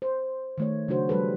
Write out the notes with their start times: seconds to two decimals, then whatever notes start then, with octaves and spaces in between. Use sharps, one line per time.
0.02 C5
0.58 D#3 A3 C#5
0.88 C#3 F#3 D4 F#4 C5
1.09 F3 G3 A4 B4